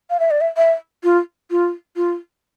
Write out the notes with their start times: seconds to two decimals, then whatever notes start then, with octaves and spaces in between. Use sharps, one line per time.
0.10 F5
0.20 E5
0.31 D5
0.41 E5
0.57 E5
1.04 F4
1.51 F4
1.96 F4